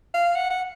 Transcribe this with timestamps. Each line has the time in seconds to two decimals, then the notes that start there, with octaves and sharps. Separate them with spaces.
0.14 F5
0.35 F#5
0.50 F#5